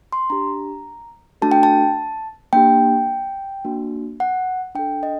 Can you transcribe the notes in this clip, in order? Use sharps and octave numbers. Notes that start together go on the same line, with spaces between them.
C6
D4 G4 A#5
A3 D4 F#4 A4 A5
G5
A5
A#3 D4 G4 G5
A#3 D4 F#4
F#5
D4 A4 G5
D#5